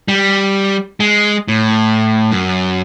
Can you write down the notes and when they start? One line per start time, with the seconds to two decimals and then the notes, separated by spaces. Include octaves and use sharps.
0.08 G3
1.00 G#3
1.48 A2
2.31 F#2